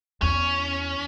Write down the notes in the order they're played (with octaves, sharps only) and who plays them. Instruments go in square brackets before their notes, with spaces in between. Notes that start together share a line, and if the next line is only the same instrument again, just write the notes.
[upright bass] E2 [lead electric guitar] C#4